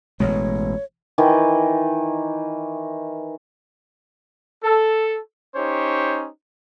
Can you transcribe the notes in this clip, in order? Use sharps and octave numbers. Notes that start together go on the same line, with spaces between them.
A1 B2 G#3 C#5
D#3 E3
A4
C#4 D#4 G4 C5 C#5